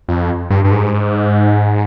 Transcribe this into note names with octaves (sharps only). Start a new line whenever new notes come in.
F2
G2
G2
G#2